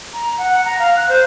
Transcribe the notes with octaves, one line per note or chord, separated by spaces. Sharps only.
A#5
F#5
A#5
F5
F#6
C5